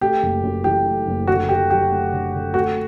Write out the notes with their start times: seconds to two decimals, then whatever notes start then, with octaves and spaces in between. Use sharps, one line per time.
0.01 A3 G4
0.22 F#1
0.43 F#2
0.64 E3 G4
0.86 A3
1.07 F#1
1.27 D3 F#4
1.49 D3 G4
1.70 F#3 G4
1.92 A3
2.12 D3
2.34 D3
2.54 A3 F#4